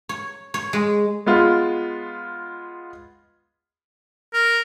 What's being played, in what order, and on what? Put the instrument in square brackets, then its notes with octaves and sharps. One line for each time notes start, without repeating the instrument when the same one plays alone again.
[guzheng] C#5
C#5
G#3
[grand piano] G#3 B3 F4
[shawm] A#4